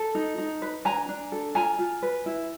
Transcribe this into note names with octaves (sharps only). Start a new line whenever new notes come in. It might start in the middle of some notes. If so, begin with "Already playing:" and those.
Already playing: A4
D#4
D#4
B4
D4 G#5 A#5
D4
A4
F4 G#5 A#5
F4
B4
E4